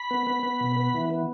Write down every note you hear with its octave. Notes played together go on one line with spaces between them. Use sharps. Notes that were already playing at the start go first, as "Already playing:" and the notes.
Already playing: B5
B3
B3
B3
B2
B3
E3
B3